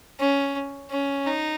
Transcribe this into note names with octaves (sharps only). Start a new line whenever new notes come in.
C#4
C#4
D#4